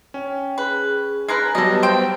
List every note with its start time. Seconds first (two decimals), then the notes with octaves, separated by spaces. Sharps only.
0.14 C#4 G5
0.58 G#4 B4
1.28 G#3 A#4 B4
1.55 F#3 G3 B3 G4 A4 B4 D#5
1.83 C5 G5